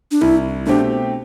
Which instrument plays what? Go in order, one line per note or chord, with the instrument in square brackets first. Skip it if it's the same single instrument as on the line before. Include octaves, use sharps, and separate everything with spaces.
[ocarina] D4
[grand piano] C2 [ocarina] E4
[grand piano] B2 A3 C4 G4 [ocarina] D4